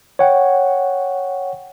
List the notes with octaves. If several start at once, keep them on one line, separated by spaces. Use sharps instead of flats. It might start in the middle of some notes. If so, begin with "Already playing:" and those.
C#5 F#5 G5